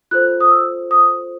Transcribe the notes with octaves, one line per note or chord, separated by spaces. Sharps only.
F4 A4 C5 F#6
D#6
E6
D#6